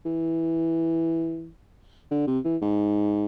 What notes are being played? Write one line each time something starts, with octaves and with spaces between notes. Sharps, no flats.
E3
D3
C3
E3
G#2